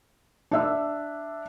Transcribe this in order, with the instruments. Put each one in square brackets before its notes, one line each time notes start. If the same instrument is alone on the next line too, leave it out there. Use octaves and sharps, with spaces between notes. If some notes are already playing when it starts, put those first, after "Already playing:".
[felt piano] D4 E5 E6